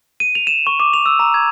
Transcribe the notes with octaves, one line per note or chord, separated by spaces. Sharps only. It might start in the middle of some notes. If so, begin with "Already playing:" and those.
D#7
F7
E7
C#6
D6
F7
E6
A#5
G#6